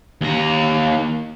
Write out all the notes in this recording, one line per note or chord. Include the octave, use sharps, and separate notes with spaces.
D#2 A#5